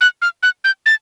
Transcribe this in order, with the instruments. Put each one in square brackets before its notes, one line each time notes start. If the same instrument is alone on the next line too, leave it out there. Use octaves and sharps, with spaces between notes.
[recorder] F#6
F6
F#6
G6
A6